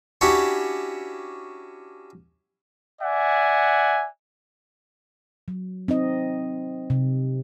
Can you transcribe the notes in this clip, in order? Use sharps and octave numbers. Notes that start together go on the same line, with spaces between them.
C#4 D4 E4 F#4 G4 C#5
D5 E5 F#5 G#5
F#3
C4 D#4 D#5
C3